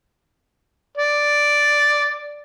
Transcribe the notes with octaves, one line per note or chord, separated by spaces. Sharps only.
D5